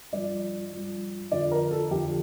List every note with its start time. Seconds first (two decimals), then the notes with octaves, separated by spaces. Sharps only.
0.13 G2 F3 D5
0.72 G2 F3
1.31 F2 D3 F3 D5
1.52 A#4
1.71 A4
1.91 F2 D3 F3 G4